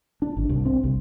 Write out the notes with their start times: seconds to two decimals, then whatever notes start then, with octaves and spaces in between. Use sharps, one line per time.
0.22 D4
0.37 G#1
0.49 C2
0.65 C4
0.84 C2